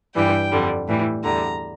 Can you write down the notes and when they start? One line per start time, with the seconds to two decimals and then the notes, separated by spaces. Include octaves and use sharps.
0.15 G2 E3 G3 G5
0.51 F2 D3 G3
0.88 A2 E3 G3
1.24 E2 D3 G3 A#5